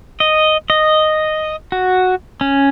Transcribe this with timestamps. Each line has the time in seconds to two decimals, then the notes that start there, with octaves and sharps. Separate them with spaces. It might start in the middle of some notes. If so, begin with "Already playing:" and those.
0.20 D#5
0.70 D#5
1.72 F#4
2.41 C#4